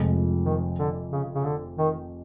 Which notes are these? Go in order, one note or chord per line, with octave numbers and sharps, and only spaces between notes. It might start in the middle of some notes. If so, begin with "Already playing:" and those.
Already playing: F1 F2 C3 F3 G#3
D#3
D3
C#3
C#3
D3
D#3